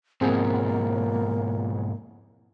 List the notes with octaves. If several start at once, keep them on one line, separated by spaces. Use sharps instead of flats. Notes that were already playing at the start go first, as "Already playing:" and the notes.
G#2 B2 F3 A#3 C4 G#4